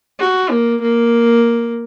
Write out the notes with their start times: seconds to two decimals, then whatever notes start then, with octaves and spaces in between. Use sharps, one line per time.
0.20 F#4
0.50 A#3
0.82 A#3